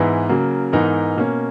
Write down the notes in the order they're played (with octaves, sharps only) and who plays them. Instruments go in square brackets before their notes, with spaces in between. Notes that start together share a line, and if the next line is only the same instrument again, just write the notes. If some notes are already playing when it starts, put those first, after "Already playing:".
Already playing: [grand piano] G#2 E3 G#3 B3 E4
C#3 F#3 A#3
G#2 E3 B3 D#4 A#4
B2 A#3 C#4